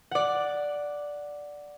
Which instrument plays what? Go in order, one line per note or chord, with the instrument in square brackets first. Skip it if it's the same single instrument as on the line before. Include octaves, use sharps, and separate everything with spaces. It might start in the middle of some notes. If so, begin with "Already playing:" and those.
[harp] D5 F#5